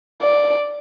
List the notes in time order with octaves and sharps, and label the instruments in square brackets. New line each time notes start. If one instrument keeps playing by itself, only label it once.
[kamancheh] D5